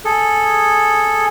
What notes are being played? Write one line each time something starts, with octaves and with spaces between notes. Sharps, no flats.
G#4 A4